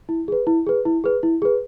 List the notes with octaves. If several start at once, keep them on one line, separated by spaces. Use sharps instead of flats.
E4
G#4 B4
E4
G#4 B4
E4
G#4 B4
E4
G#4 B4